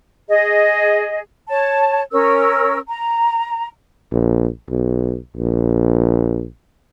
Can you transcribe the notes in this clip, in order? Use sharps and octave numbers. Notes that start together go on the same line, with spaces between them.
G#4 D#5
C#5 A5
C#4 A#4 E6
A#5
A#1
B1
A#1